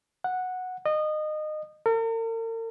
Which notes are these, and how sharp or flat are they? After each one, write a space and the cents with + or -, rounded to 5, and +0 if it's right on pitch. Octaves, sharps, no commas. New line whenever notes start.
F#5 -10
D#5 -25
A#4 -45